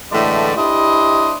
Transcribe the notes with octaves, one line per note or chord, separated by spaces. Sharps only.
A2 D3 E3 G#3 A3 D5
D4 E4 G4 C5 D#5